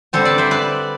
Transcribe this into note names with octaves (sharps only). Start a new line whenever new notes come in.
D3 G3 C4 A4 C5
B4 D5
C5 E5
B4 D5